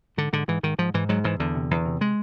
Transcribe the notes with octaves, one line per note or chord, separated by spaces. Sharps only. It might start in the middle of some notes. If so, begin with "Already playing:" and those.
G#2 D3
G#2 D3
G#2 E3
G#2 D#3
G#2 F3
G#2 E3
G#2 F#3
G#2 E3
E2 D3
C3
E2
C3
G#3